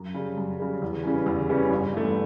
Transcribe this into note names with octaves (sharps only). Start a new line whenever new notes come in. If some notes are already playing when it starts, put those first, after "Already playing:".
Already playing: F#2
C#3 G3
F#2
C#3 G3
E2
C#3 E3 G3 C#4
E2
C#3 E3 G3 C#4
G1
G2 E3 A3